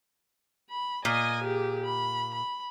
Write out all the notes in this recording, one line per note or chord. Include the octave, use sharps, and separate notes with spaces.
B5
A#2 D#5 G#5
G4 G#4
B5
B5